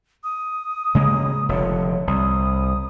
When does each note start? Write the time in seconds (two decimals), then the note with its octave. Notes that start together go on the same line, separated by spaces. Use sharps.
0.24 D#6
0.95 C#3 G#3 A#3
1.49 F1 D3 C#5
2.07 C2 D#6